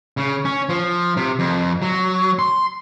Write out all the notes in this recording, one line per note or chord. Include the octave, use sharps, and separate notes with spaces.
C#3
C#4
F3
C3
F2
F#3
C6